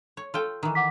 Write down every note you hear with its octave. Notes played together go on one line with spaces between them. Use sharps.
C#5
F4 A4 G5
D#3 E3
F#5 D6 B6